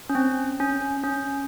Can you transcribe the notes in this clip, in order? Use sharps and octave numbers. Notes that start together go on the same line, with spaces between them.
C#4
C4
C#4
C#4